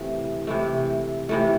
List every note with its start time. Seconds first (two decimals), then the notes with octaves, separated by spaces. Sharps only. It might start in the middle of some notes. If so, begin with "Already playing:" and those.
Already playing: C3 E3 A3
0.47 C3 E3 A3
1.29 C3 E3 A3